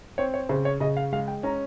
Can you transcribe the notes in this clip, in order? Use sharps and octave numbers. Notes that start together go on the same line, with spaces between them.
C4 C#5
C#5
C#3 C5
C#5
C#3 D#5
F5
G#3 F5
G5
C#4 A#5